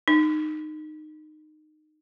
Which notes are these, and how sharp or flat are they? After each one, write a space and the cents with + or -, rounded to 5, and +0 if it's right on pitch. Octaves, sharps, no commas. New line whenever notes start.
D#4 -20